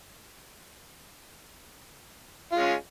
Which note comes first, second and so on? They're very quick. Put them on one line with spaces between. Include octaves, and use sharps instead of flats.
F4 G#3 C#4